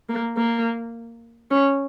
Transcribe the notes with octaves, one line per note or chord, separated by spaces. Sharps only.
A#3
A#3
C#4